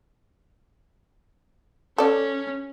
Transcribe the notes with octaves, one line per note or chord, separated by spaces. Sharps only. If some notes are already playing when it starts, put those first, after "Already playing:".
C#4 A4 D5